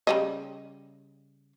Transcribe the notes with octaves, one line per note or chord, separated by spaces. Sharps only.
C#3 G3 D#5